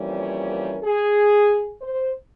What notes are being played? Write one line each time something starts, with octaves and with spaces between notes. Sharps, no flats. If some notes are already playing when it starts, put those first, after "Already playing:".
Already playing: F2 E3 G3 A#3 C#4
C#5
A#4
G#4
C5